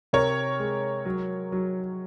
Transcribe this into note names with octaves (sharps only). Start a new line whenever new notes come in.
C3 A#4 C#5
G#3
F#3
F#3